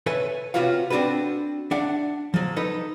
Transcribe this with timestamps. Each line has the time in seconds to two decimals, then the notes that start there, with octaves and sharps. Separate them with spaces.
0.06 A4 B4 C#5 E5 G#5
0.54 C3 F4 F#4 B4 C#5 F5
0.90 C4 D4 F#4 A4 B4
1.71 D4 E5 F#5
2.34 F3 F#3
2.56 D#4 A4 B4